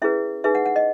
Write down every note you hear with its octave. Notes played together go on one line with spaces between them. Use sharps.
C#4 E4 G#4 B4 E5
D#4 G#4 B4 E5
F#5
F#5
D#5